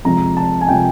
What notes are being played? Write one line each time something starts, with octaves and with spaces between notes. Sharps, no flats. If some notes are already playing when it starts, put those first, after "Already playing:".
F2 C3 F3 G#3 A#5
A5
G#5
C3 F3 G#3 G5